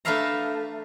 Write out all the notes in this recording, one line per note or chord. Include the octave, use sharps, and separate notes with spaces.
A3 D4 B4 E5 F5 A#5